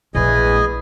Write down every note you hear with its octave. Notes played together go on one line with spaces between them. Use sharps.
A#1 E2 A3 G#4 B4 D#5 G#5